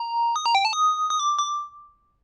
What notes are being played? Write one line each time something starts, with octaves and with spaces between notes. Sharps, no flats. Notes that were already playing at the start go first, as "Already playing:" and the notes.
Already playing: A#5
D#6
A#5
G5
A5
D#6
D#6
D6
D6